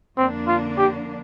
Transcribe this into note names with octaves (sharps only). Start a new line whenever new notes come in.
F2 D3 A#3 C4 D4
F4
G4